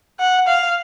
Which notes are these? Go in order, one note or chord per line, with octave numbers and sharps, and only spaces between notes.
F#5
F5